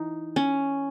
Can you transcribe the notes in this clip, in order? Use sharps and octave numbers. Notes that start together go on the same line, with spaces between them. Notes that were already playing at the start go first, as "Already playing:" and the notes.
Already playing: E3 D#4
C#4